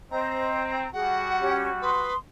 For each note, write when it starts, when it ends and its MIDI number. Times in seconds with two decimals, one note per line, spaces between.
0.11 0.86 60
0.11 0.72 72
0.11 0.72 75
0.11 0.93 82
0.93 2.10 55
0.93 2.10 66
0.93 1.28 68
0.93 1.56 78
1.39 1.68 61
1.39 1.68 67
1.82 2.14 71
1.82 2.16 84
1.82 2.16 87